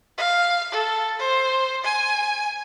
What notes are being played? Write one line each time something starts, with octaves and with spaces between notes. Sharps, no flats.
F5
A4
C5
G#5